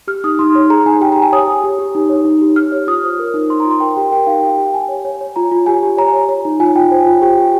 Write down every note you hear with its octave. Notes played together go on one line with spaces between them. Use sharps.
G4 F6
D#4 D#6
D#4 C6
C#5
G#4 A#5
D#4 G#5
G4 G5
A#5
G4
G#5
C#5 D#6
G4
G4
G4
D#4
C#5
D#4
G4
G4 F6
C#5
F4 D#6
C5
A#4
D#4
C5 C6
A#5
F4
C6
A#4 G5
G4 G5
A#4 G5
D#4 F5
G4 G5
G4 G5
G4 G#5
C#5
C#5
C#5
F4 A#5
F4
G4 G#5
G4
C#5 A#5
C#5
C#5
D#4
F4 G#5
F4 G5
C5
F4
G4 G5
G4